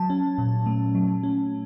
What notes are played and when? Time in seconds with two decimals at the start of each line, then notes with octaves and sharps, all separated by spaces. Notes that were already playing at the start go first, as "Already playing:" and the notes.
Already playing: F#3 A5
0.10 C#4
0.38 A#2
0.66 A3
0.95 F#3
1.23 C#4